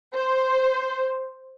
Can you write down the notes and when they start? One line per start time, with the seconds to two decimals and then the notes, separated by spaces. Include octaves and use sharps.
0.14 C5